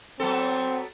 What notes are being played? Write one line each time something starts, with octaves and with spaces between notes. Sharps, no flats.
F#3 B3 C4 A4